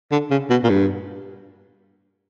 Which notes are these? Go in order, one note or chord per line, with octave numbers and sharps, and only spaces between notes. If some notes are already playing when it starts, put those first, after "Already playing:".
D3
C#3
B2
A#2
G2